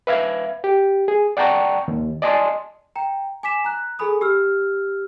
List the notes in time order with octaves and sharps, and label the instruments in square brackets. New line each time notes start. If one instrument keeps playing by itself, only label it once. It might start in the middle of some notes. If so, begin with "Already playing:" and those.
[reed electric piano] B4 E5 F5 G#6
G4
G#4
D5 F#5 G5 A5 A#5 C#6
D#2
D5 D#5 G#5 A5 C6
[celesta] G5 A#5
G#5 D6 B6 E7
A#5 F#6
G#4 A4 G#5 B5 D#6
G4 E6 F6